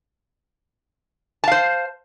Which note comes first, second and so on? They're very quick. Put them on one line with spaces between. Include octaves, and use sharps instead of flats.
A5 F5 C5